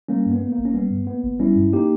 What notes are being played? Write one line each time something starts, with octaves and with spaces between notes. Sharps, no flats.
G3 A#3 C#4
G2
B3
A#3
A#3
G#1
C#4
G3 B3
G2
A#3 B3
G#1
G3 C#4 E4
G2
A#3 D#4 G4